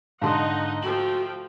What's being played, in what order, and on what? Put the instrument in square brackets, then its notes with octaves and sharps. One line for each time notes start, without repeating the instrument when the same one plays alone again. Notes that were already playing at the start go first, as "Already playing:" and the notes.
[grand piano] G#2 D3 [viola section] D#4 D#5 F#5 [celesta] F5 A5 C6
[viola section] F3 A3 G5 [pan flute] F#4 [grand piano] F#7